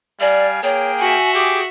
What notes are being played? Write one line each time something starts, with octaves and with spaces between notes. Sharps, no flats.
G3 D5 F5 G#5
A#3 G#4 C#5 G5
F#4 E5 G#5
G4 G#4 D6